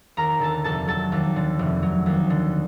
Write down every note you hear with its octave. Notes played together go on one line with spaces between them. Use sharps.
D#2 A#4 A#5
D3 A4 A5
F1 A4 A5
F#3 A4 A5
D#2
D3
F1
F#3
D#2
D3